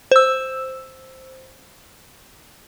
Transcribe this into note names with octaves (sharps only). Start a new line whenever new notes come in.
C5 E6